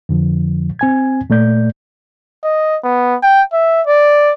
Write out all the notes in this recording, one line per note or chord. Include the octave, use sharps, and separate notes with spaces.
F2 D3 F3
C4 G#5 G#6
A#2 A3 D5 G6
D#5
B3
G5
E5
D5